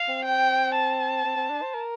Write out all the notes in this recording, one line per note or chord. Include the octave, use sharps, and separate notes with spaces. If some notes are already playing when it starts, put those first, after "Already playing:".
Already playing: F5
C4
G5
A5
C4
C4
D4
C5
A#4